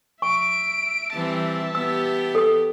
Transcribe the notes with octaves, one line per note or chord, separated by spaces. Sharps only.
E5 C#6 D7
E3 G3 C4 E5 A5
B3 G4 E6
A4 D#6